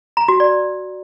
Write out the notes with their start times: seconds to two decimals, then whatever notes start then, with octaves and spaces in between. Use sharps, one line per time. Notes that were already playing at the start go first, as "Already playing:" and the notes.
0.17 A#5
0.28 F#4
0.40 D5